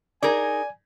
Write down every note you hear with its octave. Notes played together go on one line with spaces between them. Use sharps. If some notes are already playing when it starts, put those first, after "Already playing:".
D#4 G#4 A#4 D5 G#5